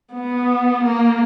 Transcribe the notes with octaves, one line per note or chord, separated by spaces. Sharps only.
B3
A#3